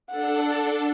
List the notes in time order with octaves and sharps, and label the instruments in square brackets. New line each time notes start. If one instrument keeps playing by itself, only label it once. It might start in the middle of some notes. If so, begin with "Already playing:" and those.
[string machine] D4 A4 [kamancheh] F#5